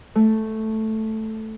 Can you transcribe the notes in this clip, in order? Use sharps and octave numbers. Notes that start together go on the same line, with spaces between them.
A3